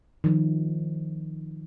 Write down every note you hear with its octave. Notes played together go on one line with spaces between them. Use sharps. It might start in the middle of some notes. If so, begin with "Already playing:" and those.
D#3 F3